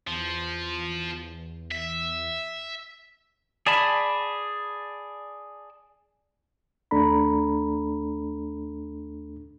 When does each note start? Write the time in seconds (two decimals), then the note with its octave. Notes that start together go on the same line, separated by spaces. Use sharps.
0.07 E2 F3
1.72 E5
3.67 G#4 D5 A5 B5
6.91 D#2 A3 D4 A4 A#5 B5